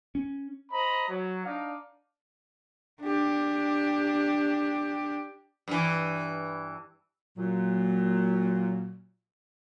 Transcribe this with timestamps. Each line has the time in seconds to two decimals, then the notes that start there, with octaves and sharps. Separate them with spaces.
0.15 C#4
0.71 C5 D#5 A#5 B5
1.08 F#3
1.45 D4 D#4 D5 F5
3.02 D4 G4
5.68 G2 E3
7.38 A#2 F#3